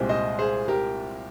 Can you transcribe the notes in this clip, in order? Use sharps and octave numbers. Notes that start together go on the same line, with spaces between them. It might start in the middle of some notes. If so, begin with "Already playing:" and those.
Already playing: C2 A#2 G#3 C4 G4
C5 D#5
G#4 C5
G4 A#4